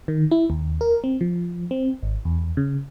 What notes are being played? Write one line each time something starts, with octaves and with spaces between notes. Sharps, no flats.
D#3
E4
D#2
A#4
C4
F3
C4
G#1
E2
C#3